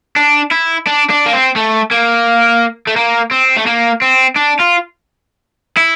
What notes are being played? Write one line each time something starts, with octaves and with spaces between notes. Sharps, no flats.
D4
E4
D4
D4
A#3
C4
A3
A#3
A3
A#3
C4
A3
A#3
C4
D4
F4
E4